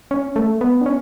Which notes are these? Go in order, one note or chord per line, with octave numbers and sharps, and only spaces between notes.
C#4
A3
B3
D4
C#4